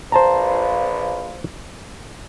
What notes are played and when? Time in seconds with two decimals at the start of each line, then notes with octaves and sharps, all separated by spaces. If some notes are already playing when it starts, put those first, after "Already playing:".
0.12 A#1 F4 B4 C5 A5 A#5